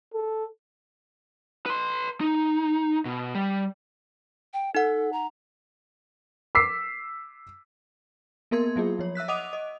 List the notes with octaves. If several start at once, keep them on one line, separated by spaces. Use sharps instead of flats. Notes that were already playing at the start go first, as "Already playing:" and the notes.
A4
B4 C6
D#4
B2
G3
G5
D#4 A4 F#5
A#5
D6 E6 B6 C7
A#3 B3 A#4 C6 G#6
F#3 A#3 F4 G#4
F3 C#5
E5 E6 F#6 B6
D#5 F#5 D6 D#6 D#7 F7
D#5